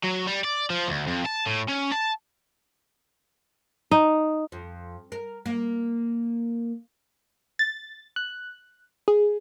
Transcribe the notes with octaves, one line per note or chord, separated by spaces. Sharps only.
F#3
G3
D5
F3
D2
F2
A5
A2
C#4
A5
D#4
F2
A#4
A#3
A6
F#6
G#4